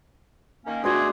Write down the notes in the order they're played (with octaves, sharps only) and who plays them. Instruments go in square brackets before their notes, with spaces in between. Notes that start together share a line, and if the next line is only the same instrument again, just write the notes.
[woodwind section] D#3 A#3 C#4
[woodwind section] B2 A3 [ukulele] D4 F#4 [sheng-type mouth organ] G#4 [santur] D5 C6 E6